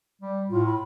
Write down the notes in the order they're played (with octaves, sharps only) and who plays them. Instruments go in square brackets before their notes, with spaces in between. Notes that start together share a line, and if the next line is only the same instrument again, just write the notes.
[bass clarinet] G3
[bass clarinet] A2 [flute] F4
[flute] B5